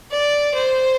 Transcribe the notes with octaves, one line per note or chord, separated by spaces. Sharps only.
D5
C5